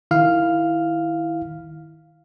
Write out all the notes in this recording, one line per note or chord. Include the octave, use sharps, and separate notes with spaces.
D#3 E4 F5 F6